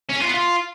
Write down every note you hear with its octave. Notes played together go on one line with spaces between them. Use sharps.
C#4
G#4
F4
B3
F4